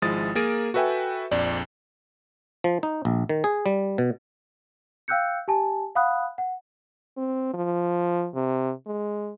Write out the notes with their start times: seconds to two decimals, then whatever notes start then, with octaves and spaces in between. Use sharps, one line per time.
0.02 G#1 F3 G#3 E4 D#6 A6
0.35 A#3 G#4 A#4 A6 D7 D#7
0.74 F#4 A4 B4 E5 G5 G#5
1.31 A#1 F2 D5
2.64 F3
2.83 D#4
3.05 A#1
3.29 D#3
3.44 G#4
3.66 G3
3.98 B2
5.08 F5 G5 E6 F#6 G6 C#7
5.48 G4 G#5 A5
5.95 F5 F#5 B5 D#6 F#6
6.38 F#5
7.17 C4
7.54 F3
8.35 C3
8.87 G#3